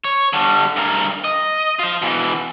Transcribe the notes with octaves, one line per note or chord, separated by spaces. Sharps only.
C#5
D3 G3
G2 A#4
D#5
F4 C5
B2 E3